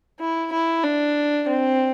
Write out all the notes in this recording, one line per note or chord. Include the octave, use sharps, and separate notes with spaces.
E4
E4
D4
C4